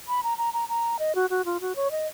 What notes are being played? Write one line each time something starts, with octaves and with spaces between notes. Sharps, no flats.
B5
A#5
A#5
A#5
A#5
D#5
F#4
F#4
F4
F#4
C#5
D#5